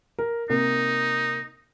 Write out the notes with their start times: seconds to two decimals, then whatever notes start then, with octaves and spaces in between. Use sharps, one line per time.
0.19 A#4
0.50 C3 A#3 D#4